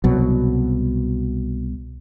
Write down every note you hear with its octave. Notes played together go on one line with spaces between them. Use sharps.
C2 B2 F#3